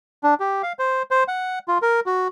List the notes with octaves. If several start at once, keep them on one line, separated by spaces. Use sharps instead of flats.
D4
G4
F5
C5
C5
F#5
F4
A#4
F#4